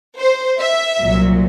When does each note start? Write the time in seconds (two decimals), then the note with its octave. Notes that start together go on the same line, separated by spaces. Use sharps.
0.18 C5
0.58 E5
0.99 C2 A#2 F#3